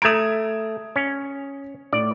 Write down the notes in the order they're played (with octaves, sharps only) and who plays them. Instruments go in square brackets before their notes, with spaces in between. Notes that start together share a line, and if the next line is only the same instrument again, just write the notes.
[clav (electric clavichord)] A3 A#5 [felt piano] D#6 G#6 D7
[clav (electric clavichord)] C#4
[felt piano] A2 [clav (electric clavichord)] D5